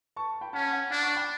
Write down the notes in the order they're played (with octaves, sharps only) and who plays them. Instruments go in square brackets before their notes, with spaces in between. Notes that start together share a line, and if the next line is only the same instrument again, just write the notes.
[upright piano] A5 C#6
G5 B5
[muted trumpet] C#4 [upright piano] F#5 A5
[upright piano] F#5
[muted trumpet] D4 [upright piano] F#5
[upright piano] A5 C#6
G5 B5